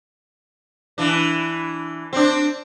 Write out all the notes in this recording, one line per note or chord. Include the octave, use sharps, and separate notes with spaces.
E3 D4
C4 D4